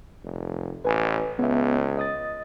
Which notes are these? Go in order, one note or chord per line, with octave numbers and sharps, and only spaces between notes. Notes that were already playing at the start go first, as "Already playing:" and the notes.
F1
A1 B4 G#5
C#2 B3 E5
D#5 D#6 A6